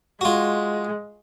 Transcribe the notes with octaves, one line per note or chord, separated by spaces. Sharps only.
G#3 F4 F#4